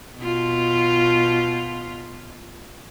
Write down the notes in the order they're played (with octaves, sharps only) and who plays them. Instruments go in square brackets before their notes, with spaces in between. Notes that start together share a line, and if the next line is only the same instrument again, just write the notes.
[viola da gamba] B2 F4